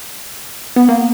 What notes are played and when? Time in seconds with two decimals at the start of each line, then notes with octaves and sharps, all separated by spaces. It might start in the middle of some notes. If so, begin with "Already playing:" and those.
0.76 B3
0.89 A#3